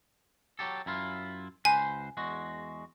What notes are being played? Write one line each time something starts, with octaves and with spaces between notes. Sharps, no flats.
F#3 G4 A4
F#2 E4 F4
C#2 B4 C5 G#5
E2 G#3 F#4